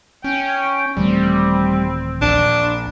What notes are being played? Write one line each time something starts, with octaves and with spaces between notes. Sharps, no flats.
C#4 G5
D#1 E3 G3 A3 C4
A#1 D4